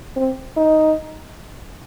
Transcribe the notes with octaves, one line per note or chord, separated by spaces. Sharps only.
C4
D#4